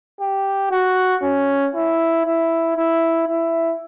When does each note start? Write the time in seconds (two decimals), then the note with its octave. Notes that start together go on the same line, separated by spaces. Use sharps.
0.21 G4
0.71 F#4
1.23 C#4
1.75 E4
2.27 E4
2.77 E4
3.28 E4